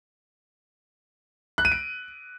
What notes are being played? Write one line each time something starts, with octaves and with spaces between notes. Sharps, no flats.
F#6
D#7
D7